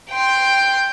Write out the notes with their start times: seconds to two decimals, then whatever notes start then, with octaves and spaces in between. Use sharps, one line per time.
0.10 G5 C6